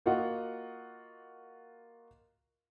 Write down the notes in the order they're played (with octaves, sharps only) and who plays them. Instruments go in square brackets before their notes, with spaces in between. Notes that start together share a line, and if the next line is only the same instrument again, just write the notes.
[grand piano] A#3 F4 F#4 D#5 F#5